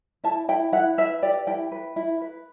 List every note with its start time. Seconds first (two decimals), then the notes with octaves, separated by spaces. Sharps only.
0.24 E4 A5
0.49 E4 G5
0.72 E4 F#5
0.98 B4 E5
1.22 G4 D5
1.47 E4 G5
1.72 B4
1.96 E4
2.21 B4